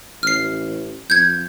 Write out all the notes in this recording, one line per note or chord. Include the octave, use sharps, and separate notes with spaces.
A1 F6 C7
F2 G6 G#6